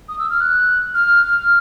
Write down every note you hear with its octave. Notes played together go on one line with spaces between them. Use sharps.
D#6
E6
F6
F#6
F6